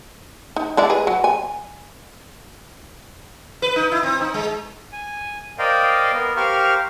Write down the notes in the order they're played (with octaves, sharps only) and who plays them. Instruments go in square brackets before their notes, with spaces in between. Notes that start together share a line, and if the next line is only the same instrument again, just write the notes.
[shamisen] D#4
G#3 E4 D5
G#4 B4
F#3
G#5
[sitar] B4
D#4
E4
C4
D#4
G#3
[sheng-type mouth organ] G#5
A#4 C5 D5 D#5 F5 G5
B3 A#4
G4 A#4 C5 F5 C#6 F6